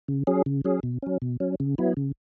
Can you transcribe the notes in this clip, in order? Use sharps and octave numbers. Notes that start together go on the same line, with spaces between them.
C#3
F#3 C#4 G#4
C#3
F#3 C#4 G#4
B2
F#3 C#4
B2
F#3 C#4
C#3
F#3 B3 E4
C#3